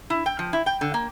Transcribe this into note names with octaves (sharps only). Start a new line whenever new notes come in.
E4
G5
F3
E4
G5
D3
A#3